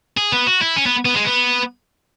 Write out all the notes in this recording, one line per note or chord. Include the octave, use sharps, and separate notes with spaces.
G#4
B3
F#4
E4
C#4
B3
B3
G#3
B3